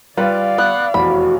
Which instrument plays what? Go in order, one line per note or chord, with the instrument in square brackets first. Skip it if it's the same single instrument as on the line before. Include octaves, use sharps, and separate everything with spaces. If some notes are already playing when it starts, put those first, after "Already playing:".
[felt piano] G3 F4 B4 [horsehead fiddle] D5 F5
[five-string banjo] B3 [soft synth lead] F#6
[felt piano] F1 E2 [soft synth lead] F#4 [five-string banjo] B5